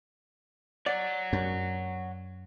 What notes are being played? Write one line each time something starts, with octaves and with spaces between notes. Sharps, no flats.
C#5 D5 F#5
F#2